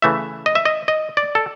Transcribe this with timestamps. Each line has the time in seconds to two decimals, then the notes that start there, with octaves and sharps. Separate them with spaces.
0.02 C#3 E3 A3 E5
0.46 D#5
0.55 E5
0.65 D#5
0.88 D#5
1.17 D5
1.35 A4